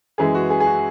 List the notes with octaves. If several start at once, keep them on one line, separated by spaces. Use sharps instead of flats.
F#2 E3 G#3 G#4
F#4
G#4
G#4
F#4